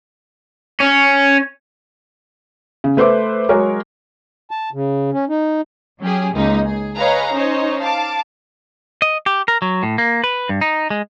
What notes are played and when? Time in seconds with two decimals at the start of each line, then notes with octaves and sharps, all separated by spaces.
0.80 C#4
2.84 C#3
2.97 A3 B4 C5 E5 D6
3.49 F#3 G#3 F#4 A#4 C#5
4.51 A5
4.73 C#3
5.12 C#4
5.29 D#4
6.00 F#3 C#4 G4 G#4
6.33 C#2 A#3 D#4
6.65 G#4
6.97 G#4 B4 C#5 D#5 F5 A#5
7.32 C#4 D#4 C5 C#5 D#5
7.80 F5 A5 D6
9.02 D#5
9.26 G4
9.48 A#4
9.62 F#3
9.83 A2
9.98 A#3
10.24 B4
10.49 G2
10.61 D#4
10.90 G#3